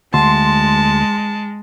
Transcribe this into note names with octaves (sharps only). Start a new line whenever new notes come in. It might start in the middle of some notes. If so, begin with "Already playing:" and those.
D2 G#3 A5 C6